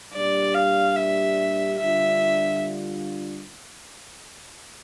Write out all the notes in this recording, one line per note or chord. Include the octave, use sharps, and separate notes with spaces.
A#2 G3 D4 G4 D5
F5
E5
D3 G3 D4 F4 E5